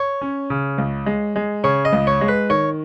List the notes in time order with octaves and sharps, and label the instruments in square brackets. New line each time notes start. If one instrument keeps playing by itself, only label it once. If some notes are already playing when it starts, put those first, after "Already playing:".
Already playing: [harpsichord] C#5
[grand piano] C#4
C#3
C#2
G#3
G#3
[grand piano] C#3 [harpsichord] C#5
[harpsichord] D#5
[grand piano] C#2
[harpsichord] C#5
[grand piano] G#3
[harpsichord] B4
[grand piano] D#3 [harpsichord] C#5